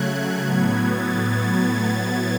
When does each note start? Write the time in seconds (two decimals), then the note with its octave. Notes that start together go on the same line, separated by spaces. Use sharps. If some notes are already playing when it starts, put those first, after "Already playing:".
Already playing: C#3 F#3 A3 F#6 G#6
0.43 A2 F#3 B3 G#6
0.84 A6